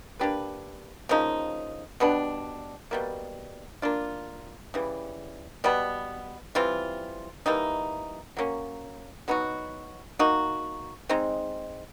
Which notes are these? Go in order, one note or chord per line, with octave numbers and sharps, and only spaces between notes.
A#3 D4 G4 B4
C#3 F3 A#3 D#4
B2 G3 B3 D4
B2 G3 A#3
A#3 D4 F4
C#3 E3 G3
B2 G3 B3
E3 G3 C4 F4
E3 G3 A#3 D#4
F#3 A#3 C#4
F#3 B3 D#4 F#4
A#3 D#4 F#4
G#3 C4 D#4